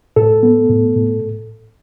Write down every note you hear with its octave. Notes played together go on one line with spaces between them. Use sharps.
A2 A4
B3
A2
A2